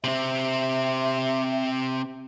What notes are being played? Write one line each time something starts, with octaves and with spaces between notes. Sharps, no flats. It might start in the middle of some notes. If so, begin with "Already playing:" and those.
C3 C4 E5